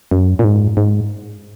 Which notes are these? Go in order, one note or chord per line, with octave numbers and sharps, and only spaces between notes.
F#2
A#2
G#2
G#2